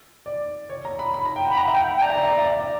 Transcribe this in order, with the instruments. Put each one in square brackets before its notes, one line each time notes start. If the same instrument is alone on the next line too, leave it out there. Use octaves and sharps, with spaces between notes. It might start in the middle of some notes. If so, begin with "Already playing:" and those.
[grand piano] D5
C#5
A#5
B5
B5
A#5
G5
F#5
[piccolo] B5
[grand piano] F#5 [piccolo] A#5
[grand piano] E5
[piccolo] G5
[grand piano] F#5
[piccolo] G5
[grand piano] D5 [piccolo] A#5
[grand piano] E5
D5
E5
D5
E5
D5
E5
D5